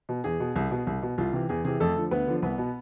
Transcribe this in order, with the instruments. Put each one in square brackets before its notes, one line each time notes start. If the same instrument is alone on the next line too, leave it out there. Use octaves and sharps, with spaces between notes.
[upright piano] B2
E2 G#4
B2
C2
B2
C2
B2
C2 F4
C3 E3
E2 G#4
C3 E3 G#4
F2 A3 A4
D3 F3
D2 B3 B4
D3 F3
C2 B3 B4
B2